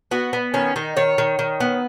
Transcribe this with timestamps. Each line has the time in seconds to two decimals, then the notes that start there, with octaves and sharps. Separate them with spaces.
0.11 B3 F#4
0.33 B3
0.54 D#3 C#4
0.76 D#3 D#4
0.96 D#3 C#5
1.18 D#3
1.39 D#3
1.60 B3